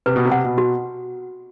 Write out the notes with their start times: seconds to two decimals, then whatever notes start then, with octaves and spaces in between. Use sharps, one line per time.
0.06 C3 B4
0.16 B2
0.25 C3
0.32 F#5
0.45 B2
0.58 F#4